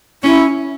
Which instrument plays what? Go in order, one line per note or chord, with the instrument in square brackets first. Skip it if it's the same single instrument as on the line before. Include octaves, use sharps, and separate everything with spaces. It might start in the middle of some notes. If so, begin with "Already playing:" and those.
[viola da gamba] C#4 [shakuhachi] E4